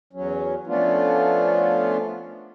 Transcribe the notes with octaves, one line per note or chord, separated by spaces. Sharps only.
E2 F#3 C#4
F3 A3 B3 C#4 D4 F4